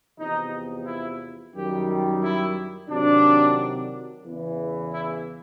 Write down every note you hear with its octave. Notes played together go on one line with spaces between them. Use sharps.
E2 C3 F3 D#4
E4
F#2 D#3 G3 G4
E4
C3 D#3 F#3 D4
E2 C#3 E3
E4